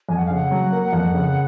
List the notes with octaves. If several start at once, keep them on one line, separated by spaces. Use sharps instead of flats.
F2 G#5
F#5
F5
C#3 F#5
F#3
A#3
F2
C#3